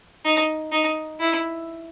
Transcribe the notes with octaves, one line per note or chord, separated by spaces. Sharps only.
D#4
D#4
E4